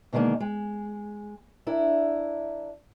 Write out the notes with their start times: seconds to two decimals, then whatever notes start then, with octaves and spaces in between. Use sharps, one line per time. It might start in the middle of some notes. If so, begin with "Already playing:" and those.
0.13 B2 D3 D#3 G#3 A#3
0.40 G#3
1.67 D4 E4 A#4